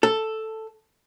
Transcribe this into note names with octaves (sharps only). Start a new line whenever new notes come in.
A4